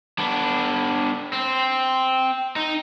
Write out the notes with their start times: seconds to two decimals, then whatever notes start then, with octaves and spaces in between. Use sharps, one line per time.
0.18 B3 D4
1.33 C4
2.56 D#4